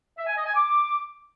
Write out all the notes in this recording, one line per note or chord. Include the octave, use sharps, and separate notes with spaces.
E5
G#5
D#5
G#5
D6